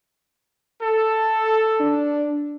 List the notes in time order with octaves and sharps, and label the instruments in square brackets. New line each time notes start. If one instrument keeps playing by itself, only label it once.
[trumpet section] A4
[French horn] D4